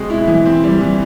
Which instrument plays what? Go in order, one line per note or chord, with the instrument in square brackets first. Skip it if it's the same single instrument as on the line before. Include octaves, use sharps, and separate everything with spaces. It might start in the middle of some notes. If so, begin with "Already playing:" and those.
Already playing: [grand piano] B2 G#3 C4
E4
E3
C4
G3
E3